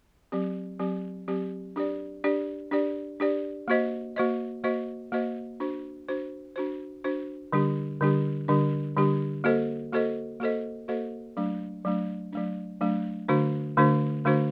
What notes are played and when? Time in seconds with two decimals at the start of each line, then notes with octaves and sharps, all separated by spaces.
0.32 F#3 C4 G4
0.80 F#3 C4 G4
1.28 F#3 C4 G4
1.76 D4 G4 D5
2.24 D4 G4 D5
2.71 D4 G4 D5
3.20 D4 G4 D5
3.68 A#3 F#4 C5 D#5
4.16 A#3 F#4 C5 D#5
4.64 A#3 F#4 C5 D#5
5.12 A#3 F#4 C5 D#5
5.60 D4 F#4 C5
6.09 D4 F#4 C5
6.56 D4 F#4 C5
7.04 D4 F#4 C5
7.52 D3 G3 D4 G4
8.01 D3 G3 D4 G4
8.48 D3 G3 D4 G4
8.96 D3 G3 D4 G4
9.44 A#3 F#4 A4 C5 D#5
9.92 A#3 F#4 A4 C5 D#5
10.40 A#3 F#4 A4 C5 D#5
10.88 A#3 F#4 A4 C5 D#5
11.37 F#3 A3 D4
11.85 F#3 A3 D4
12.32 F#3 A3 D4
12.81 F#3 A3 D4
13.28 D3 A3 D4 F#4 C5
13.77 D3 A3 D4 F#4 C5
14.25 D3 A3 D4 F#4 C5